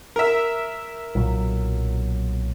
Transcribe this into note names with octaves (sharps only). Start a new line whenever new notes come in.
A#4 E5
B1 A#2 F#3